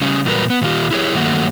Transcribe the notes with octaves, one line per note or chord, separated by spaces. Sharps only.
C#3 G3 C#4
E2 A#2 F#3 G3 A#4 B4
B3
A#2 D#3 F4 G4
E4 G4 G#4 C#5
G2 D#3 F#3 A3 A#3 F#4